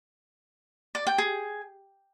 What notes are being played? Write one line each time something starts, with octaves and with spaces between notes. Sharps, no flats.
D5
G5
G#4